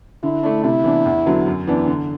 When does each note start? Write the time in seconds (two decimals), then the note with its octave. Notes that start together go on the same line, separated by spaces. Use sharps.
0.23 D3 E4
0.43 A3 D4
0.63 C3 E4
0.84 E3 B3 D4
1.05 E2
1.26 D3 F#3 B3
1.46 F#2
1.67 E3 B3 D4
1.87 D3